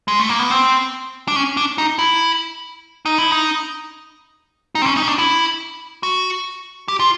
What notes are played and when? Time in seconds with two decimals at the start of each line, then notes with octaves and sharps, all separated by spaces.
0.08 G#3
0.19 A3
0.29 A#3
0.39 B3
0.50 C4
1.28 D4
1.36 C#4
1.57 D4
1.78 D#4
1.99 E4
3.06 D#4
3.18 E4
3.32 D#4
4.75 D#4
4.82 C4
4.86 C#4
4.97 D#4
5.02 C#4
5.07 D4
5.18 E4
6.03 F#4
6.88 G4
6.99 F4